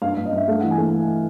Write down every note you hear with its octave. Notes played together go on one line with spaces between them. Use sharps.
G2 F5
G2 F5
D#5
G2 E5
A3 F5
E3 F#5
G#5
A3